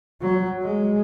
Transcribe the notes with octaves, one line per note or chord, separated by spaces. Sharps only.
F#3
G#3